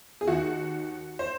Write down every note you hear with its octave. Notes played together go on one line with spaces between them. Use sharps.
G#4
D#2 D#3 F#4
C5